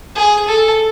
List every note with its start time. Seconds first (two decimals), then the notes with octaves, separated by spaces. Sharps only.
0.15 G#4
0.48 A4